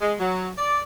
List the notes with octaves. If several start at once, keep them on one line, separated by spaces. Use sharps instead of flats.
G#3
F#3
D5